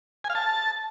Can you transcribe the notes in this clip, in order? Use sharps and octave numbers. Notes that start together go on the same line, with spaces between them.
G#5
F5
A5